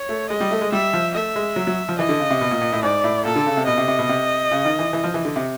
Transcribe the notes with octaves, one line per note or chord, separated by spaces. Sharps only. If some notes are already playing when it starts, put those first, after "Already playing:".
Already playing: C#5
A3
G#3 D#5
G3
A3
G#3
G3 E5
F3
A3 E5
G#3
F#3
F#3
F3
E3 D#5
D3
C#3
C3
B2
A#2
A#2
A2
G#2 D5
A2
A#2 A4
D3
C#3
C3
B2 D#5
C3
C3
B2
C3
C#3
D#3
E3
E3
F3
E3
D3
C3